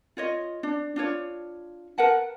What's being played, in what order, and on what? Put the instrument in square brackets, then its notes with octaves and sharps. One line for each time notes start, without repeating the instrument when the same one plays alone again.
[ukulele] F4 C#5 D#5
D4
D4 F4 C#5
A#4 B4 F#5 A5